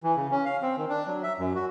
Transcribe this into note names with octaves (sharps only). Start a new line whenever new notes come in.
E3
C#3
C#4
F5
C4
D#3
D4
F#3
E5
F#2
F#4